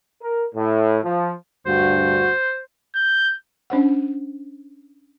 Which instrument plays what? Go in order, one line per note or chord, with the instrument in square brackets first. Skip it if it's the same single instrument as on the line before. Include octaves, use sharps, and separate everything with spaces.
[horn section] A#4
A2
F3
[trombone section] D2 G2 F#4 [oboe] C5
[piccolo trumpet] G6
[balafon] C#4 D4 C5 F#5